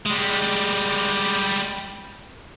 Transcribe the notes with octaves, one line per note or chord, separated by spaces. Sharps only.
G3 G#3